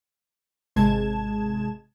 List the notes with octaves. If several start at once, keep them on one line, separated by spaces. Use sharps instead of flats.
G#1 C3 G#3 A5 G#6 E7